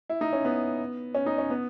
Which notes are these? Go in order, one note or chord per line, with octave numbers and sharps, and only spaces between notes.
E4
D#4
C#4
B3
C#4
D#4
C#4
B3